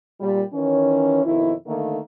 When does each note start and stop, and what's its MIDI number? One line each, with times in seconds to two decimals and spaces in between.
0.21 0.43 46
0.21 0.43 55
0.53 1.25 51
0.53 1.25 52
0.53 1.25 61
1.25 1.53 41
1.25 1.53 47
1.25 1.53 51
1.25 1.53 64
1.67 1.98 50
1.67 1.98 51
1.67 1.98 57
1.67 1.98 58